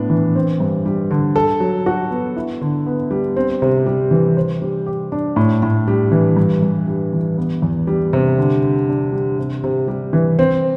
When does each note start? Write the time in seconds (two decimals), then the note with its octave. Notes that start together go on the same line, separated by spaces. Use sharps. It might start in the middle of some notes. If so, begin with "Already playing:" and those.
Already playing: A2 B3 D4
0.10 E3
0.36 C4
0.60 G2
0.86 G3
1.11 D3
1.36 A4
1.60 F#3
1.86 F#4
2.11 B3
2.37 E4
2.61 D3
2.86 B3
3.11 G3
3.37 C4
3.62 C3
3.86 G3
4.11 E3
4.37 C5
4.62 G3
4.86 G4
5.12 D4
5.36 A2
5.63 A2
5.88 G3
6.12 E3
6.37 G2
6.62 G2
6.88 G3
7.13 E3
7.38 B3
7.62 E2
7.87 G3
8.13 C3
8.38 D3
8.63 D3
8.89 D4
9.13 G3
9.39 C3
9.64 C3
9.88 G3
10.13 E3
10.39 C4